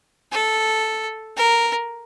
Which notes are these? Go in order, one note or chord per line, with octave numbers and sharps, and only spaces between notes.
A4
A#4